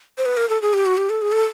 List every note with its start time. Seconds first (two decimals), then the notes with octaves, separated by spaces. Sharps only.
0.18 C5
0.26 B4
0.37 A#4
0.49 A4
0.62 G#4
0.73 G4
0.86 F#4
0.97 G4
1.09 A4
1.22 G#4
1.32 A4